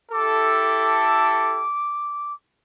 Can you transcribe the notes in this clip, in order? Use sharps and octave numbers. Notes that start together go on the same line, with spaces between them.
E4 G4 A4 D6